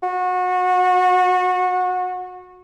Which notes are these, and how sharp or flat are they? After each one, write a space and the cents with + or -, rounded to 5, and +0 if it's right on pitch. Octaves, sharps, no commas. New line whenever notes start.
F#4 -25